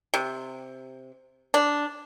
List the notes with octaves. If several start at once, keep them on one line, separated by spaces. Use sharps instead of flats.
C3
D4